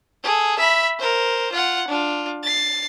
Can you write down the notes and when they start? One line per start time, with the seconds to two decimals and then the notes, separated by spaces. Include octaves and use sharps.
0.23 G#4 A4
0.59 E5 B5
0.99 A#4 C5
1.53 F4 F#5
1.88 D4 F4
2.43 A6 C7